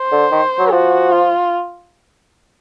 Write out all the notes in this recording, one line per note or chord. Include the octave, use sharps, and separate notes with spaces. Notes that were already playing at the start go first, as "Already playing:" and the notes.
Already playing: C5
D3
D#3
F#3
F3 F#4
F4